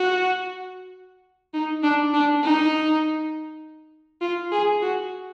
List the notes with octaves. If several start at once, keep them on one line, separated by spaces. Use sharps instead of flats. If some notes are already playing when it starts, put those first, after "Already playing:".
Already playing: F#4
D#4
D4
D4
D#4
F4
G#4
F#4